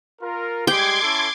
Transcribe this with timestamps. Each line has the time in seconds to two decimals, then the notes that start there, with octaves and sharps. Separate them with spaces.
0.21 F4 A#4
0.67 G3 G#3 G4 G5 C6 D6 G#6
1.02 C#4 E4 A4